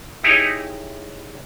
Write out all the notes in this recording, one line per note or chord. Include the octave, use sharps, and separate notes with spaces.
D#4 E4 G4 G#4 C#5 D#5